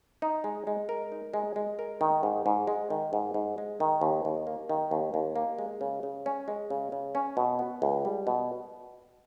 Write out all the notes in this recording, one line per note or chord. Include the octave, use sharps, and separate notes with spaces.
D#4
G#3
G#3
A#4
D#4
G#3
G#3
A#4
D#3
G#2
G#2
G#3
D#3
G#2
G#2
G#3
D#3
D#2
D#2
A#3
D#3
D#2
D#2
A#3
G#3
C#3
C#3
C#4
G#3
C#3
C#3
C#4
B2
B3
C#2
G3
B2